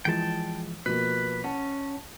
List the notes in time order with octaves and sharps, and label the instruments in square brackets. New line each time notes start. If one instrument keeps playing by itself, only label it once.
[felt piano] E3 F3 G#3 [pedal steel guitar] G5 A5
[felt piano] B2 F3 A#3 [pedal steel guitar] B4
[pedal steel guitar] C#4 [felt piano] F#5 A5